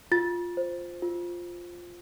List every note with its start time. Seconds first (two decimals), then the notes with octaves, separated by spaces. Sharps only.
0.12 F4 A6
0.57 C5
1.02 F4